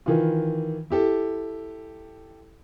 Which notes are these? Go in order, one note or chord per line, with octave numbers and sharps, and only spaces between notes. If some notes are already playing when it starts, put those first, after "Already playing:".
D#3 E3 F4
E4 G4 A4